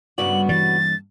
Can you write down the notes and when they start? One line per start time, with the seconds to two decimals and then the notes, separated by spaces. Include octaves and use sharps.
0.18 G2 C#3 A#3 B3 F#4 D5 F#7
0.49 E3 G3 A6